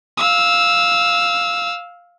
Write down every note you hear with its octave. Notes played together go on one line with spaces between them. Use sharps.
F5 E6